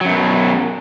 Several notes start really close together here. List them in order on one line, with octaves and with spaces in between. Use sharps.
F#3 F#2 B2